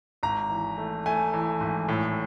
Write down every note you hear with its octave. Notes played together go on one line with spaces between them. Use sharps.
G#1 A#5
E3
A3
A3 G#5
E3
G#1
A2